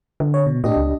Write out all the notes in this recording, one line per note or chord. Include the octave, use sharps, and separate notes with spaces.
D3
C#5
B2
A2 D4 G4 D#5
C#2